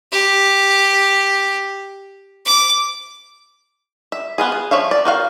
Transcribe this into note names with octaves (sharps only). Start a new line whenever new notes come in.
G4
D6
E5
B3 F4 G#4
G#4
F3 C#5 E5 F5
D5
D#3 F#4 F5